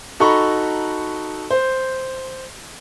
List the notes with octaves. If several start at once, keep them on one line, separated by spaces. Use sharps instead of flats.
D#4 F#4 A4 A#5 B5 C#6
C5